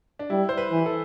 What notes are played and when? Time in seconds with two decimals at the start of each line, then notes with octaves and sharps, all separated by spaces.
0.19 D4
0.30 G3 E4
0.49 C5
0.57 B4
0.72 E3
0.86 A4